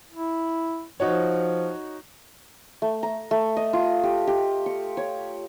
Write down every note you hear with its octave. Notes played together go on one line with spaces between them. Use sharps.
E4
F3 D#4 F#4 C#5
A3
A#5
A3
D#5
F4
G4
G4
C#6
C#5